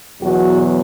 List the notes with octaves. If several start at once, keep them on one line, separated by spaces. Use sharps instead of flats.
E2 B2 F#3 F#4